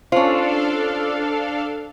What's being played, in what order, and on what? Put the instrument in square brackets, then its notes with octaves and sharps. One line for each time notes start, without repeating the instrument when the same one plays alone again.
[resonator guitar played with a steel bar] C#4 F4 [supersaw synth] D4 A4 F5 [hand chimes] C5